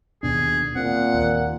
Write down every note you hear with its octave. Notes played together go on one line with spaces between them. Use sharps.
D#2 B2 D4 G#4
A#2 C4 F#5
D#2